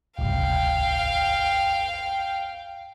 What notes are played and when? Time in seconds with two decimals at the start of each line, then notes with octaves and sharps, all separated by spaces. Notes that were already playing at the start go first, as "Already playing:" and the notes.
0.19 D1 G1 C2 F5 G5